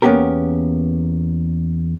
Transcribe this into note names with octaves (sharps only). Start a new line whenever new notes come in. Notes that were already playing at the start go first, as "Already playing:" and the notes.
E2 A#3 B3 C#4 G4 A#4